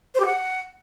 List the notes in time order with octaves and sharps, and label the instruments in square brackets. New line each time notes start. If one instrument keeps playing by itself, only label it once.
[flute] C5
G4
F#5